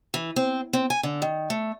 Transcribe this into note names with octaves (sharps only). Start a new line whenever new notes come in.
E3
C4
C4
G#5
D3
D#3
A3